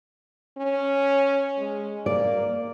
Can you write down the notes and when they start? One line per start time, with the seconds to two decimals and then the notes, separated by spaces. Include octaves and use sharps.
0.58 C#4
1.57 G#3
2.06 A#3 D5